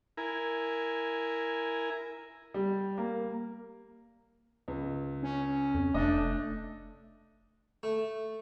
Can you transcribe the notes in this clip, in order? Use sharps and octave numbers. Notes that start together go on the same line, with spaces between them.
E4 A#4 G#5
G3
A#3
C#2
C#4
F2
F1 A3 D4 D#5
A3